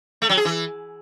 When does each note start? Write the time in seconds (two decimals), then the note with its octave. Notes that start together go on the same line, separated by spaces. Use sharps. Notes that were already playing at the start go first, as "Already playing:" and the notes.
0.22 A3
0.29 F#3
0.37 G#4
0.45 E3